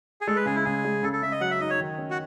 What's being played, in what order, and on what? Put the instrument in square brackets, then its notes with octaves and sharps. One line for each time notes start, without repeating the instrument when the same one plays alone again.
[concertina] G#4
[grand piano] G#3 [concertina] A4
[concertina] B4
[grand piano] C#3 [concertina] G#4
[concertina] E4
[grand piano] C#3 [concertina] G#4
[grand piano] G#3
[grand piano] C#3 [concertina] A4
[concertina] A4
[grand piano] C#3 [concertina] E5
[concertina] D#5
[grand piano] F#3 [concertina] F#5
[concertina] E5
[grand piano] D#4 [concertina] D#5
[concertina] C#5
[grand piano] D#3
C#4
[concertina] F#4